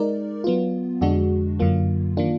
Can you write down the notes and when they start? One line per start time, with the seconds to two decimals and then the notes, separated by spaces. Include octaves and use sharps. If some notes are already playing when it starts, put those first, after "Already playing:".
Already playing: G#3 D#4 A#4 D5
0.44 F#3 B3 F4
1.01 F2 D3 G#3 D4 F#4
1.59 F#2 D3 F#3 A#3 F4
2.17 D#3 A#3 D4 F4